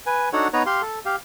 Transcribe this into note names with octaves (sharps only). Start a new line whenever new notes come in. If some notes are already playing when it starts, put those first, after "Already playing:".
B4 G#5
D4 D#4 F#4 A4 C#5 F#5
B3 D#4 B4 C#5 A#5
G4 F5 C6
A4
G4 F5